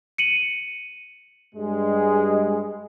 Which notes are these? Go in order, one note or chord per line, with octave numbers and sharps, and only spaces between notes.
C#7 D#7 F#7
G2 G3 G#3